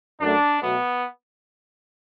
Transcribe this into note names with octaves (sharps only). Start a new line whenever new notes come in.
F#2 F#3 A3 D4
B2 F#3 A3 B3